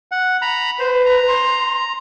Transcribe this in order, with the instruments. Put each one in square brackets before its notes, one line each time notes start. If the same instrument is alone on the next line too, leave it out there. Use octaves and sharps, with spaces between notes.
[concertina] F#5
A#5 B5
[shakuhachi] B4 [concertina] C5
[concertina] A#5
[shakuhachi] C6